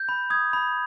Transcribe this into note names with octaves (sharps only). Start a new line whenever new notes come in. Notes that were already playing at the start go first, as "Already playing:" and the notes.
Already playing: G6
B5
D#6 G#6
B5